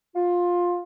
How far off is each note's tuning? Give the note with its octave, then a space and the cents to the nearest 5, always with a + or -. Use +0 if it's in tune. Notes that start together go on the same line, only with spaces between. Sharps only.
F4 +15